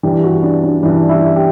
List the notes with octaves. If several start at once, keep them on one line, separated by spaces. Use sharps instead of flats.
G2 E3 G4
F#4
D4
D4
G2 E3 D4
E4
G4